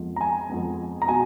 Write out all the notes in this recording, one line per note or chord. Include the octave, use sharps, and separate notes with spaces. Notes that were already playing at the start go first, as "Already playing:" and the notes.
Already playing: F2 F3 G#3 B3
A#5
G#5
F2 F3 G#3 B3
A#5
B2 G#5